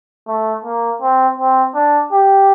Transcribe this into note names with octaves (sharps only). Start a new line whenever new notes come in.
A3
A#3
C4
C4
D4
G4